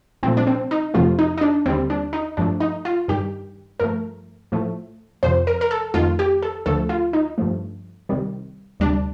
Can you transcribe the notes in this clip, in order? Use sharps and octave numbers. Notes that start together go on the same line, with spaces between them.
C2 A#2 F3 A3 C4
D4
C4
D#4
F2 C3 F3 A3 F4
D#4
D#4
D4
D#2 D3 G3 C4
D4
D#4
G2 F3 A3 D4
D#4
F4
G2 D#3 G3 G4
G2 F3 A3 A#4
A2 F3 A3
F2 C3 F3 C5
A#4
A#4
A4
F2 D#3 A3 F4
G4
A4
D2 D3 F3 A3 A4
F4
D#4
G2 F3 A3
C2 C3 D#3 G3
D2 C3 G3 D4